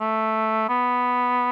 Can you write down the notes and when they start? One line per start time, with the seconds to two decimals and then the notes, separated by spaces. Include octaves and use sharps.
0.01 A3
0.69 B3